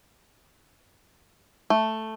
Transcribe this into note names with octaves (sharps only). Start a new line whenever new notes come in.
A3